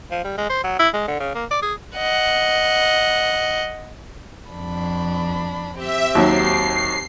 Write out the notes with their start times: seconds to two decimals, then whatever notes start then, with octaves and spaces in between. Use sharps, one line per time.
0.11 F3
0.24 G3
0.37 G#3
0.49 C5
0.64 F#3
0.79 E4
0.93 G#3
1.08 D3
1.20 C#3
1.35 A#3
1.51 D5
1.62 G#4
1.97 D#5 F#5
4.50 F2 D4 B5
5.77 C4 G4 E5
6.15 D#2 F#3 C7